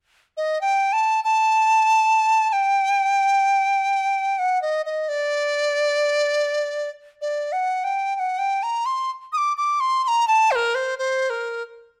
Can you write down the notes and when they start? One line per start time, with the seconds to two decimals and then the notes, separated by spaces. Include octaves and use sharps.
0.37 D#5
0.61 G5
0.93 A5
1.24 A5
2.49 A5
2.53 G5
4.39 F#5
4.62 D#5
4.86 D#5
5.09 D5
7.21 D5
7.52 F#5
7.84 G5
8.15 G5
8.19 F#5
8.39 G5
8.63 A#5
8.86 C6
9.33 D#6
9.37 D6
9.57 D6
9.80 C6
10.04 C6
10.08 A#5
10.28 A5
10.51 C5
10.56 A#4
10.75 C5
10.99 C5
11.30 A#4